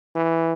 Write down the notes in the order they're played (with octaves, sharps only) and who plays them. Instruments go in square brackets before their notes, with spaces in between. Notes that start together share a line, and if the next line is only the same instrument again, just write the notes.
[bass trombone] E3